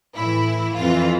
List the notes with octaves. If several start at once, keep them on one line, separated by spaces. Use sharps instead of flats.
A2 E4
E3
F2 E3 F4